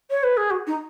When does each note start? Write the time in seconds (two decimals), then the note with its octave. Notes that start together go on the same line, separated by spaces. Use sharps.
0.10 C#5
0.23 B4
0.37 G#4
0.50 F#4
0.67 D#4